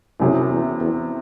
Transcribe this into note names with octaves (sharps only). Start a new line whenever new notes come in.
C2 F#2 C3 F#3 C#4 G#4
E2
E2